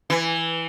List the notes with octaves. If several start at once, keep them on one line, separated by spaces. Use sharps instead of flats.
E3